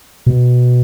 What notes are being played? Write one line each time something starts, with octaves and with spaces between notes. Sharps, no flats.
B2